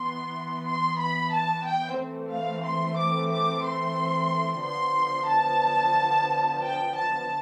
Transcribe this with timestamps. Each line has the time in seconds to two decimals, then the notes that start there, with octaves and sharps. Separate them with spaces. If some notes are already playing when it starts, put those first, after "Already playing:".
Already playing: E3 B3 C6
0.66 C6
1.00 B5
1.33 A5
1.66 G5
2.00 E3 A3 C4
2.32 F5
2.65 C6
2.98 D6
3.32 D6
3.65 C6
4.64 D3 F3 B3 C6
5.30 A5
6.63 G5
6.96 A5